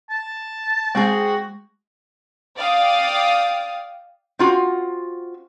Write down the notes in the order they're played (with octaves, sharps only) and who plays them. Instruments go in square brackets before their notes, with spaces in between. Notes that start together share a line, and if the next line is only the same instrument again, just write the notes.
[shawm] A5
[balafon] G#3 [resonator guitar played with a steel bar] C4 G#4 [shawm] F#4
[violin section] D5 F5 G5 D#6
[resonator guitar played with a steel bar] C4 F4 F#4